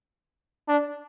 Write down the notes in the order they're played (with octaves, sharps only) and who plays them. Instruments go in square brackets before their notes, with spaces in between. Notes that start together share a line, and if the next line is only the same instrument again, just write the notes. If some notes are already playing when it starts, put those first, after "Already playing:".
[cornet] D4